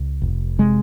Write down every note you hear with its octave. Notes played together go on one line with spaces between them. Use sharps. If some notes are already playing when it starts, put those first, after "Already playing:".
Already playing: C#2
F1
C3 G#3